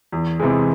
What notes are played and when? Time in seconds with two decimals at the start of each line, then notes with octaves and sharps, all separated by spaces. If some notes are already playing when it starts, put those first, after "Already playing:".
0.12 E2
0.40 C3 E3 G#3